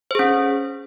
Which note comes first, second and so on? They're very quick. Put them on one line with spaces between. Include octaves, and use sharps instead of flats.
C5 G#4 C#4